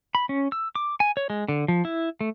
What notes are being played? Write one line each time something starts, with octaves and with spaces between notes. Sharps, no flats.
B5
C#4
E6
D6
G#5
C#5
G#3
D3
F3
E4
A3